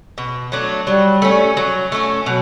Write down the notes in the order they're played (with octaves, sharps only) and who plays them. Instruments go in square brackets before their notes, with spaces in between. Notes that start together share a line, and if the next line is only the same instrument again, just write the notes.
[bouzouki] B2
F#3 A3 D4
[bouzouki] F#3 [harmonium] G3
[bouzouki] A3 C#4
F#3
A3 C#4
[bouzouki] B2 [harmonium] F#3